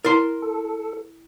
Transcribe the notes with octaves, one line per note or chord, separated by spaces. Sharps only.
E4 A#4 A#5 C6
A4